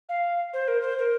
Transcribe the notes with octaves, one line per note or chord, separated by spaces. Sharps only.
F5
C5
A#4
C5
A#4